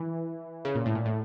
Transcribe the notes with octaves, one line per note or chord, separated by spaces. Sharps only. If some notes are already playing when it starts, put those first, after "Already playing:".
Already playing: E3
C#3
A#2
A2
A#2
A2